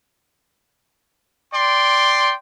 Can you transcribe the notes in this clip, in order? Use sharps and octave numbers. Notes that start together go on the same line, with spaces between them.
D5 G5 C6